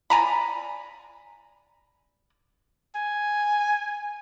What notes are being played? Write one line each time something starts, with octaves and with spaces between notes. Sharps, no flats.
D5 G#5 A#5 B5
G#5